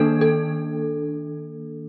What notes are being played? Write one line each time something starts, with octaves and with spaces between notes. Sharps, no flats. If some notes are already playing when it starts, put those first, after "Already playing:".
Already playing: D#3 A#3 D4 A4
A4